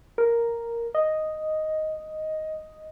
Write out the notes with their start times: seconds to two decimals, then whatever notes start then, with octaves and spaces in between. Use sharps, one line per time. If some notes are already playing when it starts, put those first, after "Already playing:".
0.18 A#4
0.95 D#5